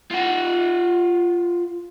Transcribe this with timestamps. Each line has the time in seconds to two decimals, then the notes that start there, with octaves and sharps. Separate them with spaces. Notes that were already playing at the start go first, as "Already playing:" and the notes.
0.11 F4 F#5